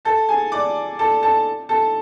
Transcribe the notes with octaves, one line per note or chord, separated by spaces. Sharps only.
A4 A5
G#4 G#5
D5 D6
A4 A5
A4 A5
A4 A5